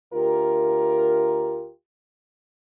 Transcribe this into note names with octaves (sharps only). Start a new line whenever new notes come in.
D2 F4 G4 A#4